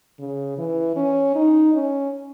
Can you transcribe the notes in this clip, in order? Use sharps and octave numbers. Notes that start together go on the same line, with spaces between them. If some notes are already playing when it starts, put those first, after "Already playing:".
C#3
E3
C#4
D#4
C#4